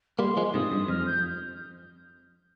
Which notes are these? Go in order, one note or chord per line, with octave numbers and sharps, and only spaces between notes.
G3 A#3 C6
F3 G#3
G#2 C3 D#6
G2
F2 F6
G6